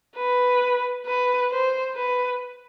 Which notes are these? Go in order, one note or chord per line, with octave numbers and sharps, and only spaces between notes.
B4
B4
C5
B4